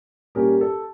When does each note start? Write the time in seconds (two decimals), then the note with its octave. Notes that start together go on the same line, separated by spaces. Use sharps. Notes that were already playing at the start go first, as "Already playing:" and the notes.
0.35 A#2 G3 C#4 G4 A#4
0.61 A4